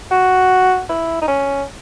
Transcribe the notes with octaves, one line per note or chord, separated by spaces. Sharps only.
F#4
E4
D#4
C#4